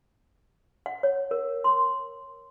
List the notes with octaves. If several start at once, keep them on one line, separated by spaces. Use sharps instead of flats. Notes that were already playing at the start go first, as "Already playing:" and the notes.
F#5
C#5
A#4
C6